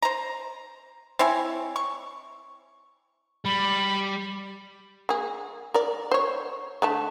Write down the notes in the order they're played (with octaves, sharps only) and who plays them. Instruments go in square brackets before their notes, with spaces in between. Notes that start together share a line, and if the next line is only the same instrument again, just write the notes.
[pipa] C5 A#5
C4 E4 C#5 G#5
C#6
[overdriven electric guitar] G3 [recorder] B5
[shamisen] A#3 G#4
A#4 D5
C5 C#5
D3 A3 A5